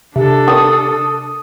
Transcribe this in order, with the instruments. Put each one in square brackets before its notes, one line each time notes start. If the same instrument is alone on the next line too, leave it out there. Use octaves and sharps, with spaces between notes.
[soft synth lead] C3 [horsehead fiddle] D4 A4
[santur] D#6